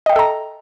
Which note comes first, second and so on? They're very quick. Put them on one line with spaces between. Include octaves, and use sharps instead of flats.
D#5 G5 E5 A4 A#5